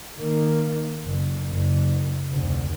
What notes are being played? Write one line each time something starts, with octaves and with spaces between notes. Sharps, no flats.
D#3 A#3
F#1
F#1
F1 D2